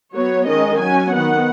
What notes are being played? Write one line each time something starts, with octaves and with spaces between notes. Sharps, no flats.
F#3 B3 C#5
D#3 G#3 C#4 D#5
F#3 C#4 G#5
D#3 B3 F#5